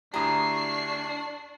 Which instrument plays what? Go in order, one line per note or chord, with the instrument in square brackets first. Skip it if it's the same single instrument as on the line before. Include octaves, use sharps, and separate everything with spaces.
[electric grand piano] D2 E4 G4 [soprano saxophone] D4 [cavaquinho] A#5 D#6 [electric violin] C#6 C7